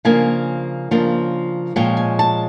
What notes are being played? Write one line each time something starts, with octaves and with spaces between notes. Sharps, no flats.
C#3 F3 A#3 D4 G#5
C#3 F3 A#3 D4
A#2 F3 G#3 C#4 G5
G#5
A5